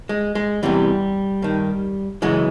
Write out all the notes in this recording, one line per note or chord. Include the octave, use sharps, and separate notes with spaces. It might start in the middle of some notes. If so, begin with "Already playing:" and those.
G#3
G#3
E2 C3 E3 G3
G2 D#3
F#2 C#3 E3 G#3